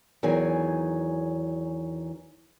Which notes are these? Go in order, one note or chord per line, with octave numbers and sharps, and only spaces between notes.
E2 D#3 E3 F#3 G#4 G#5